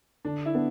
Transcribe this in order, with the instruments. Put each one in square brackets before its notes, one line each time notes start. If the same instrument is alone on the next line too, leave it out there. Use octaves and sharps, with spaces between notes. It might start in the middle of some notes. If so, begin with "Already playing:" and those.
[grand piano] D3 [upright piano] D4
[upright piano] E4
[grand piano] B3 [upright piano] D4